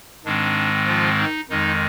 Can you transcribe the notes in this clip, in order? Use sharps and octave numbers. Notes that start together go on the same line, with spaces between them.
G#2 D#3 G#3 C4 D4
F3 F4
D#4
F2 D#3 G#3 D#4